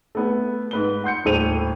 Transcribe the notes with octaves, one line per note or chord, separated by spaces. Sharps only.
A3 B3 A4
G#2 B4 G7
F#5 C6 G6 C#7
D#1 A2 A4 C5 D#7 F7